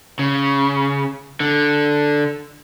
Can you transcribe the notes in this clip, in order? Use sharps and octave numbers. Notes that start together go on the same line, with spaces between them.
C#3
D3